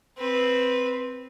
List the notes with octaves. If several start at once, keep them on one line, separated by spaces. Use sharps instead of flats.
C4 B4